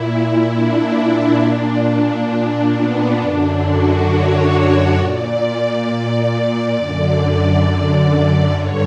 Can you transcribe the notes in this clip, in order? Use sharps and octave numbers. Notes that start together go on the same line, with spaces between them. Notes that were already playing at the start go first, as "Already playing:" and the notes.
Already playing: A#2 E4
D4
A#2
B3
F#2 D3 D4
F#4
C#5
A#2 D5
F#2 D3
G2 D3 C#5